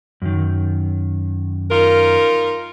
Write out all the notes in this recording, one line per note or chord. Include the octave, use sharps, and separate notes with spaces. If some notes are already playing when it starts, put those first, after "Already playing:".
F#2 D#3
D#4 F4 A#4